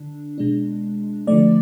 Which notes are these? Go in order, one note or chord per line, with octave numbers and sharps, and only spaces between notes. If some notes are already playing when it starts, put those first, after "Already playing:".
Already playing: D3 D4
B2 G#3 D4
D3 F3 A3 D5